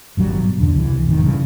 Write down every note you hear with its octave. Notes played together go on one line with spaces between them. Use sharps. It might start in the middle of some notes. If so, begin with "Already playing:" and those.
G#1 G2 F#3 G3
B2
E2 B2 D3
C2 E3
E1 G2 D#3
G2 C#3 E3